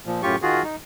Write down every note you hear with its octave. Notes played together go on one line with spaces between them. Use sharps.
A#2 F3
F#2 A2 F4 G4 C#6
D#3 F4 F#4 G#4
D#4